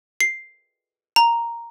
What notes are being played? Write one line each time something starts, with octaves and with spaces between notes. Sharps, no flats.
C7
A#5